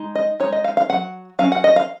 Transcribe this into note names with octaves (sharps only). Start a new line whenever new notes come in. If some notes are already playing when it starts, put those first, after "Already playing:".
Already playing: G#3 D#4
D#5
G#3 D#4 C#5
D#5
F5
F5
F#3 C#4 F#5
F#3 C#4 F5
F#5
D#5
F5